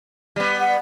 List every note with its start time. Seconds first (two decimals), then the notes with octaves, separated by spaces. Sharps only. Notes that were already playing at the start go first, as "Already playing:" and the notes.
0.36 G3 B3
0.60 F#5